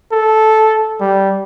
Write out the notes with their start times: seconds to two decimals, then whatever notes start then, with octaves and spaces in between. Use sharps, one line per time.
0.12 A4
1.00 G3